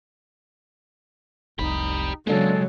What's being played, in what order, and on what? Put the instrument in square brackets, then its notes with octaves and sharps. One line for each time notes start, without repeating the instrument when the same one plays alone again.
[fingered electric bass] F1 C2 [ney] D#4 [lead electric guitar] G4 B5
[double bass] C#3 F#3 [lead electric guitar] G#3 [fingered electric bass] A#3 D4 [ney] A4